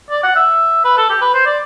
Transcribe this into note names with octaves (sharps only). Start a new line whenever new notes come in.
D5
F#5
E5
B4
A4
G4
B4
C5
D5